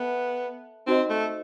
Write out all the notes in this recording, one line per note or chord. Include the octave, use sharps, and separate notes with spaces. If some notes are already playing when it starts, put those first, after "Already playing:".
Already playing: B3 A4 E5 A5
C4 D#4 F#4 C5 D#5
A3